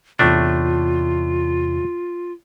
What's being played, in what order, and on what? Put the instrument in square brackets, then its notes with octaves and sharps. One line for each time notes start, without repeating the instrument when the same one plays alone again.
[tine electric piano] E2 C3 [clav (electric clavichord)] A2 A3 D4 [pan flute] F4